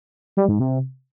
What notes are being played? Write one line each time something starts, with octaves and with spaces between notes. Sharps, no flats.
G3
G#2
C3